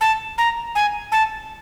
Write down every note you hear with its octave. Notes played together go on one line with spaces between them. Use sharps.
A5
A#5
G#5
A5